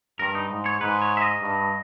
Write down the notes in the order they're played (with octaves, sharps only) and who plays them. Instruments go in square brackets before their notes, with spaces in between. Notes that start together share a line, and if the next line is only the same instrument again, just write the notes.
[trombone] G2 [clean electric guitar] A#4
[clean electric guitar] D#4
[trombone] G#2
[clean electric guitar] C#5
[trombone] G#2 [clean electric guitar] B4
[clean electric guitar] C#5
E5
D#5
[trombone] G2